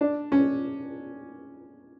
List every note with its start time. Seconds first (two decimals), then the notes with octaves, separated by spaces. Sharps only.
0.01 D4
0.32 C#4